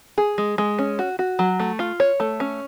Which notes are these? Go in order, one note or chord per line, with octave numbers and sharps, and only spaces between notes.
G#4
G#3
G#3
C#4
F#4
F#4
F#3
A3
F4
C#5
A3
C#4